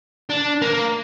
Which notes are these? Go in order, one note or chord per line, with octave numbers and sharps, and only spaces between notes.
D4
A#3